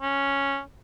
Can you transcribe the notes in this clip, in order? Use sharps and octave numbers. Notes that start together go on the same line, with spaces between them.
C#4